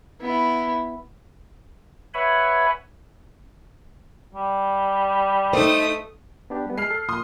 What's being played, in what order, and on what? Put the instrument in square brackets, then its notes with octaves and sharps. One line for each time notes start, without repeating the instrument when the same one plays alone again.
[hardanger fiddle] B3 E4
[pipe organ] B4 C#5 E5 F#5 G#5 B5
[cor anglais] G3
[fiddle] A3 D#6 [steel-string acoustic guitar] D#4 C5
[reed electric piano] B3 D4 G4
G3 B3
[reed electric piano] G#3 [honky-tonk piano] F6 C7
[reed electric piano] A4
[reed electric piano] A#2 [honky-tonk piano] C6 D#6